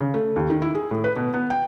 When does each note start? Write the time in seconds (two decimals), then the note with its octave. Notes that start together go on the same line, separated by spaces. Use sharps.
0.01 C#3
0.14 A3
0.36 D#2
0.50 D#3
0.62 E4
0.75 G#4
0.91 A2
1.04 B4
1.16 B2
1.34 B3
1.50 G5